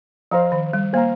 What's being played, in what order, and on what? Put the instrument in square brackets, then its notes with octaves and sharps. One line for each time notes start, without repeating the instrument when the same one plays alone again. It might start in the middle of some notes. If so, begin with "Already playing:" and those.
[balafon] F3 [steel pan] C5 F5 A#5
[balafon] D#3
G3
[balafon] A#3 [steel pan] C5 F5 A#5